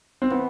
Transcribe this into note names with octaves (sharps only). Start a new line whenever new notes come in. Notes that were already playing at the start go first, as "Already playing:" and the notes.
C4
E3 B3